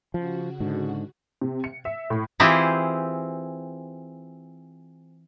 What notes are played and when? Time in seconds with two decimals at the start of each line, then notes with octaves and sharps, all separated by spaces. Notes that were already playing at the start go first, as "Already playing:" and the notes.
0.14 C#3 F3 F#4
0.60 G#2 D3
1.41 C3
1.64 C#7
1.85 E5
2.10 A2
2.40 E3 C4 E4 F4 G4 G#4